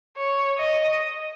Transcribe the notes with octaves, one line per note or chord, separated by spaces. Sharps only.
C#5
D#5